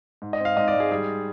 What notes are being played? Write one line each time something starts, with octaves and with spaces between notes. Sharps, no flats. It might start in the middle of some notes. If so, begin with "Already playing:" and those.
G#2
D#5
C4
F5
G#2 D#5
D5
G#2
G#4
G3 G#4